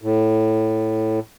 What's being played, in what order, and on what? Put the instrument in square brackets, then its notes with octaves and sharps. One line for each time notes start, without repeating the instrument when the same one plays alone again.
[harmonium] A2